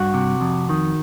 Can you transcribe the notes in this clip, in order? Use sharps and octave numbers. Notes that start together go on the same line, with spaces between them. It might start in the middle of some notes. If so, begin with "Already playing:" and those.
Already playing: G2 F#4
C3
F2
D#3